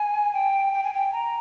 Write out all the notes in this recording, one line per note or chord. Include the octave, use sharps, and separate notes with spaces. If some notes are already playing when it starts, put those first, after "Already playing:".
Already playing: G#5
G5
G5
G#5
G5
A#5